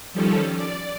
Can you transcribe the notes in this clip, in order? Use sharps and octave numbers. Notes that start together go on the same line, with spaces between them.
D#3 F3 G3 C#4 A4
D5